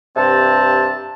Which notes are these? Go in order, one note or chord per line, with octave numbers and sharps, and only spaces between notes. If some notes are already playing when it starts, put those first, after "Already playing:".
G2 C3 C4 A5